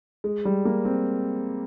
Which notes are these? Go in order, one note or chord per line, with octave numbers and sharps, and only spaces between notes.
G#3
G3
A#3
C4